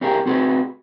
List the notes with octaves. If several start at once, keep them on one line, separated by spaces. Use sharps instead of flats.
C#4 G4 G#4 A#4
C4 F#4 G#4 B4